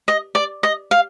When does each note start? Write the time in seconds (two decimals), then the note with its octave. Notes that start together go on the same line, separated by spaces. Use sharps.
0.08 D#5
0.35 D5
0.63 D#5
0.91 F5